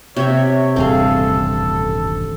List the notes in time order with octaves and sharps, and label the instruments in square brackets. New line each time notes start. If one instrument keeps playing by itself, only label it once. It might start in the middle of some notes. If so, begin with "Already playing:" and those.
[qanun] C3 G4 E5 [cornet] C#5
[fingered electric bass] D#1 A1 G2 [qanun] C4 G#4 F5 [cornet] A4